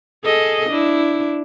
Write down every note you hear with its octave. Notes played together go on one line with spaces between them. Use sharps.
G#4 A4 D#5
D4 E4